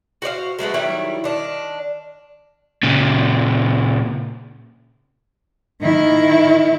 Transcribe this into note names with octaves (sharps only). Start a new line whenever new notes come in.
F#4 C5 D5 F5
F#3 G#3 A3 B3
D#3 F#3 G3 E4
D#3 D4
A#2 C#3
D#3 E4